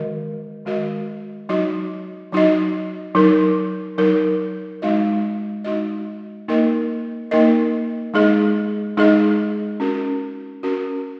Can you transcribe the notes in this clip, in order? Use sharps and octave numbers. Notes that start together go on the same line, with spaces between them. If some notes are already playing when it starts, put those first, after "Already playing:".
Already playing: D#3 G#3 F#4 A#4 D#5
D#3 G#3 F#4 A#4 D#5
F#3 D#4 F#4 D#5
F#3 D#4 F#4 D#5
F#3 D#4 A#4
F#3 D#4 A#4
G#3 D#4 F#4 D#5
G#3 D#4 F#4 D#5
A#3 D#4 A#4 D#5
A#3 D#4 A#4 D#5
G#3 D#4 G#4 D#5
G#3 D#4 G#4 D#5
C#4 F#4 A#4
C#4 F#4 A#4